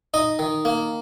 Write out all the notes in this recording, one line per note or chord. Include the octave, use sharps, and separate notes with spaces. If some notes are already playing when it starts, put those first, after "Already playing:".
D#4 D#5
D#3
A#3